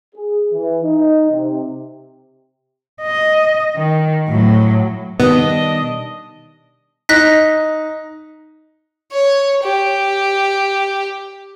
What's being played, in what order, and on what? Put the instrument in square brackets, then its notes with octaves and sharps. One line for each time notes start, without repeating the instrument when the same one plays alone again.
[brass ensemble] G#4
E3
D#4
C3
[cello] D#5
D#3
A2 F#3
[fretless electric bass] B2 D#3 G3 [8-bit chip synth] B3 [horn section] D4 D#5
[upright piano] D#4 [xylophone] F#6 A#6 B6
[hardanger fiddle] C#5
G4